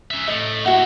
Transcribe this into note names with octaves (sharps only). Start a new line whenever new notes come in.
C#4 E5
A2 A3 D#5 D#6
A#3 E4 F#4 E5 F#5